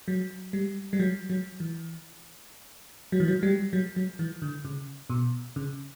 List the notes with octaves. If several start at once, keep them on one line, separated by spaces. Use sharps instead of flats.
F#3
G3
G3
F#3
F#3
E3
F#3
E3
F#3
G3
F#3
F#3
E3
D3
C#3
B2
C#3